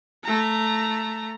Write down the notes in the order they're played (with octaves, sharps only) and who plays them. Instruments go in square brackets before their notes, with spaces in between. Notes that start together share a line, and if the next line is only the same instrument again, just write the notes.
[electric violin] A3 A#5